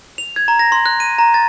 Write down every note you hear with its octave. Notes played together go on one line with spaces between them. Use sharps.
F7
G#6
A#5
A#6
C6
F#6
D#7
A#5
A6